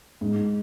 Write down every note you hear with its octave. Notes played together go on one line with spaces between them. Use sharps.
G#2